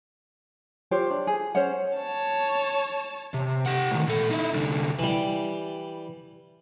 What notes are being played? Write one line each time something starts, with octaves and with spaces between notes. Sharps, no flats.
F4 G4 C5 C#5
D4
G#4
C#4 C5 C#5 F#5
C#5 A5
C3
G4 F#5
A2 D#3
A#2 A4
D#4 E4
C2 D3
E3 G3